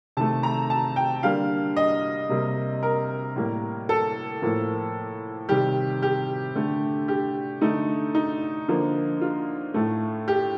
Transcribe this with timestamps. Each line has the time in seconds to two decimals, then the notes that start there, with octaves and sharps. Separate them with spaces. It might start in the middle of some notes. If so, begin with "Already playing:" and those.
0.17 C3 D#3 A3 A5
0.43 A#5
0.70 A5
0.96 G5
1.23 D3 G3 A#3 F5
1.77 D#5
2.29 C3 G3 A#3
2.83 A#4
3.36 A2 G3 A#3
3.89 A4
4.42 A2 F3 A#3
5.49 C3 D#3 G3 G4
6.02 G4
6.55 D3 A3
7.08 G4
7.61 D3 A3 D#4
8.15 D#4
8.68 D3 F3 A#3
9.21 F4
9.74 A2 A3
10.28 G4